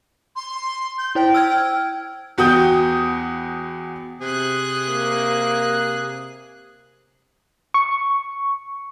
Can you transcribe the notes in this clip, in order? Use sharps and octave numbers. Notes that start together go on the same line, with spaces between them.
C6
G6
E4 C5 G5
E6 F6 G#6
E2 F#4 G5 D#6 G6
C3 G#4 F#6
A#3
C#6